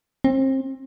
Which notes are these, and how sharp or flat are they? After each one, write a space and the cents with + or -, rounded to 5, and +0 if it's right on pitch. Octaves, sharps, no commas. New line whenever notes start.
C4 +30